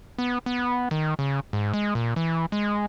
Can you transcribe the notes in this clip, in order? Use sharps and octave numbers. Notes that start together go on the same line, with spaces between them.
B3
B3
D#3
C#3
G#2
G#3
A#2
E3
G#3